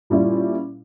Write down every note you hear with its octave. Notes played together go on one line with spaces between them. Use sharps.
A#2 G3 C#4 E4 F4